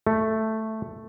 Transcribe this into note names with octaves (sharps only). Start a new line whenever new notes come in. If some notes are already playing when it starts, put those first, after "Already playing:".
A3